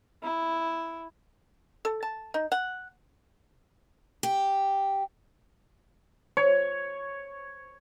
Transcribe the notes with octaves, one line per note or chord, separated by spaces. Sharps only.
E4
A4
A5
D#4
F#5
G4
C#5